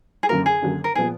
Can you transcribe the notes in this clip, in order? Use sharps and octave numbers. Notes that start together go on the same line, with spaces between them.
G#4
F#2 D3 F#3 A#3 A#4
G#4
F#2 D3 F#3 A#3
A#4
A#2 F3 B3 G#4